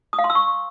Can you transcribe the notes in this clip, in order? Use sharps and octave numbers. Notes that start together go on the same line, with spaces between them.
D#6
F5
C6
E6
C#6